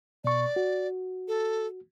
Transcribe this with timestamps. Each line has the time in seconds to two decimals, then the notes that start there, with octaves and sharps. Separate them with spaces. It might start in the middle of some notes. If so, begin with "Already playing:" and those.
0.24 B2 D5 C#6
0.56 F#4
1.28 A4